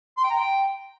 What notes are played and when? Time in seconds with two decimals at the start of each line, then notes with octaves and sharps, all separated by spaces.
0.17 C6
0.24 G5
0.30 A#5
0.36 G5